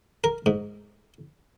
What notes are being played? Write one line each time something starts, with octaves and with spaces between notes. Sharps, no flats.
A#4
G#2